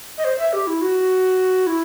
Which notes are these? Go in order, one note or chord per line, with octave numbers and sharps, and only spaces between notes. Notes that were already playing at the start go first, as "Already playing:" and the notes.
D#5
C5
E5
G4
E4
F#4
E4